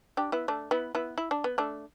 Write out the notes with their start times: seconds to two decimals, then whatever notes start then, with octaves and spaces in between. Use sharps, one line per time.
0.17 D4 G4
0.32 B3 E4
0.48 A3 D4
0.71 B3 E4
0.95 B3 E4
1.18 E4
1.31 D4
1.44 B3
1.58 A3 D4